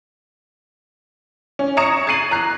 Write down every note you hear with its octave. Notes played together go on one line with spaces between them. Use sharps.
C#4
A#5 C#6 D#6 G#6 C#7 E7
G#6 A6 C7 D#7 F#7
A#5 F#6 C7